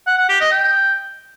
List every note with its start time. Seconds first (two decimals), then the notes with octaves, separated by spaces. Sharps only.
0.07 F#5
0.18 F#5
0.29 G4
0.40 D#5
0.52 G5